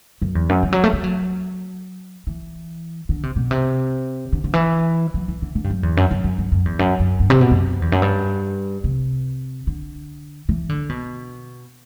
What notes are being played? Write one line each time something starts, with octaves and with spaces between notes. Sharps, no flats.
F#2
E2
F#2
E3
F#3
A3
G3
F#3
E3
D3
C3
B2
C3
D3
D3
E3
F#3
E3
D3
D3
G2
F#2
E2
F#2
F#2
F#2
G2
F#2
E2
F#2
F#2
G2
C3
B2
F#2
E2
F#2
G2
C3
D3
E3
D3
B2